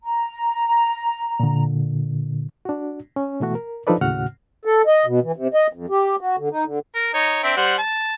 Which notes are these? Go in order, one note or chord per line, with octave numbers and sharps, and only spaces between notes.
A#5
A#2 D3
D4 F#4
C#4
B2 E3 A3 F#4
A#4
F3 D4 D#4 A4 B4 D5
D#2 A2 C#3 F#4 F#5 F6
A4
D#5
B2
E3
C3
D#5
F2
G4
F#4
D3
D#4
D3
A#4
D#4 C#5
C4 D4 E5
G3 C5 F#5
A5